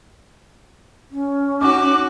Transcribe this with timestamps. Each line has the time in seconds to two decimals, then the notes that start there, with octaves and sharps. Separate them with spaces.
1.11 C#4
1.61 D#4 F#4 D6